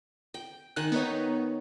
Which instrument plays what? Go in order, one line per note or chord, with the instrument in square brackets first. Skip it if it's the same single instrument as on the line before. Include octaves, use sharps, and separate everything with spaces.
[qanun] G5
[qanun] D#3 G#5 [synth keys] F#6
[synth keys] B3 D#4 C#5